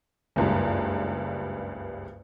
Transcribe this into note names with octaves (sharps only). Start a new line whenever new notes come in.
F#1 C#2 G2